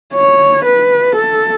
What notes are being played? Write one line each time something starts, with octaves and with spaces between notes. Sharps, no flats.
C#5
B4
A4